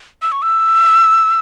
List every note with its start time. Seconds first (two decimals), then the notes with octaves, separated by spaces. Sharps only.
0.22 E6
0.32 C#6
0.42 E6